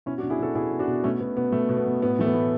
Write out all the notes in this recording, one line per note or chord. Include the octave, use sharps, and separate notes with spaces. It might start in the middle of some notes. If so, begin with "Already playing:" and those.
B2 C#4 E4
D4 F#4
B2
E4 G#4
B2 F#4 A4
B2 E4 G#4
B2
D4 F#4
B2
B2 A3 C#4
B2 B3
B2 B3
B2 A3
B2
B3
B2
A2 B3
E3 A3
B3
A2